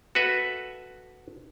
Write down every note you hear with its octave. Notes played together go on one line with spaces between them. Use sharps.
F#4 A4 B4 E5